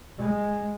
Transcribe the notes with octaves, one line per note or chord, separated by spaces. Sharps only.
G#3